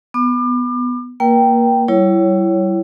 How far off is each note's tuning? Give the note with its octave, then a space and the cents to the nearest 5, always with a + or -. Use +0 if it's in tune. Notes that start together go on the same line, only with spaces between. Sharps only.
B3 +5 D6 +35
A#3 +0 A#4 +45 G5 -5
G3 -35 E4 +20 C#5 +0